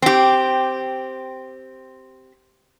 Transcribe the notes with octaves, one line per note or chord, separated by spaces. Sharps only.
C4 G4